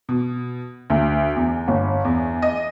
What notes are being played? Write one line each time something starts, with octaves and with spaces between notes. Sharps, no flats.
B2
D2
E2
G1
E2
D#5